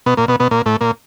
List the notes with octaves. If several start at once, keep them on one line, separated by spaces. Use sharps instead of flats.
B2 B3
A#2 A#3
B2 B3
B2 B3
A#2 A#3
A2 A3
A#2 A#3